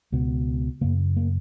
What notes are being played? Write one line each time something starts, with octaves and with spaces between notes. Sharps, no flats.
C#2 B2
F#2 C#3 A#3
A#3